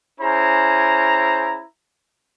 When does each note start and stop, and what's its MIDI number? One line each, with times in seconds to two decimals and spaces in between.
0.21 1.63 61
0.21 1.63 64
0.21 1.63 68
0.21 1.63 72
0.21 1.63 82